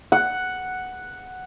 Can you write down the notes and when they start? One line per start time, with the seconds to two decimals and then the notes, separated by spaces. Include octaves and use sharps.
0.12 F#5